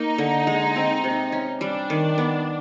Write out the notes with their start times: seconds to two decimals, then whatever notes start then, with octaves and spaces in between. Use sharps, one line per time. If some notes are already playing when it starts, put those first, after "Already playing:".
Already playing: A#3 D#4
0.18 D3
0.47 G#3
0.76 C4
1.04 C3
1.32 C#4
1.61 G3 D4
1.90 D#3
2.18 B3